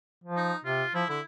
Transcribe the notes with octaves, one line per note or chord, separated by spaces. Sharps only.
F3
D#4
C3 F4
F3 E4
D3 E4